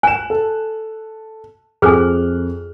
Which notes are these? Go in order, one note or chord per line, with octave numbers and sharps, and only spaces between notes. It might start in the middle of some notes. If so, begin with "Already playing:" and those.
G#5 F#6 E7
A4
F2 G#4 A4 G#5 F6 F#6